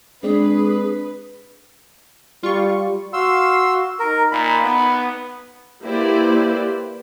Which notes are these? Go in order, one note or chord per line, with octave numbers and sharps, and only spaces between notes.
G#3 C4 D4 G#4 B4 D5
G3 F4 C#6
F#4 F5 C6 E6
D#4 A#4
A#2 B5
B3
A#3 E4 G4 B4 C5 D5